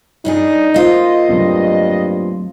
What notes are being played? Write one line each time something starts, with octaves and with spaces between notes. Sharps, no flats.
G2 D4 D#4 G#4
A#3 F4 C5 D#5
G2 F#3 A3 C4